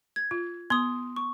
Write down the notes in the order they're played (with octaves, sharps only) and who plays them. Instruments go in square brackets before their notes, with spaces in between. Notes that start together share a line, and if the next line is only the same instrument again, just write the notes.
[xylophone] G#6
[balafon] F4
[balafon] B3 [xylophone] C6 D#6
[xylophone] C#6